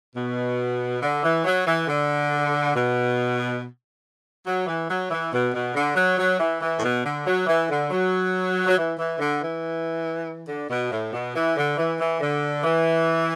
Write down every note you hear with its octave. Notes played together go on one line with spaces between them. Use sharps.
B2
D3
E3
F#3
E3
D3
B2
F#3
E3
F#3
E3
B2
B2
D3
F#3
F#3
E3
E3
A2
B2
D3
F#3
E3
D3
F#3
F#3
E3
E3
D3
E3
D3
B2
A2
B2
E3
D3
E3
E3
D3
E3